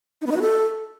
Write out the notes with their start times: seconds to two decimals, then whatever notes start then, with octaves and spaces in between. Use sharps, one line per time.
0.21 D#4
0.26 B3
0.31 D#4
0.36 F#4
0.41 A4